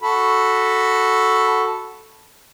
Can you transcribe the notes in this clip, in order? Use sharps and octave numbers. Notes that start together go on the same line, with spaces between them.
F#4 A4 B5